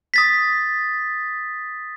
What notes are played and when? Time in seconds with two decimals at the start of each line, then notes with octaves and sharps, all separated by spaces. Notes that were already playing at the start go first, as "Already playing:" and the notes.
0.14 D#6 A6 B6